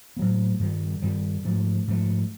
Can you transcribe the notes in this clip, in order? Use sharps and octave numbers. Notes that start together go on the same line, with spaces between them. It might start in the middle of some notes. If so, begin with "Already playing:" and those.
A2 F#3 A#3
G2 D#3 G3
G2 D#3 G3
G#2 F3 A3
G#2 F3 A3